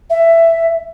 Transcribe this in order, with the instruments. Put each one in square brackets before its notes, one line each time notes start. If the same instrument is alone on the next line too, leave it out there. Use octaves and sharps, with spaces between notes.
[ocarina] E5